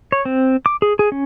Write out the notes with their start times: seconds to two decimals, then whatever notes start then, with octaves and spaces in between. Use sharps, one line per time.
0.12 C#5
0.25 C4
0.66 D6
0.82 G#4
0.99 G#4
1.12 C#4